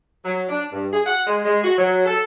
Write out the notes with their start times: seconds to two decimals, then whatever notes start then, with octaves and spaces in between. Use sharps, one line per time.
0.23 F#3
0.49 D4
0.72 G2
0.92 G#4
1.05 F#5
1.26 G#3
1.45 G#3
1.64 F#4
1.77 F#3
2.06 A4